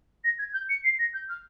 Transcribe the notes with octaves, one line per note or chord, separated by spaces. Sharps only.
A#6
G#6
G6
C#7
C7
A#6
G6
F6